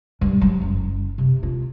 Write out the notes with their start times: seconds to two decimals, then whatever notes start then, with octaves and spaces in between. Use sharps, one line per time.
0.21 G2
0.41 F#3
0.61 F#1
1.18 C3
1.43 F4